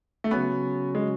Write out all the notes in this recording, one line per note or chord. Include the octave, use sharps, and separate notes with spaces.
A3
C#3 F#3 B3 C#4 F#4
G#3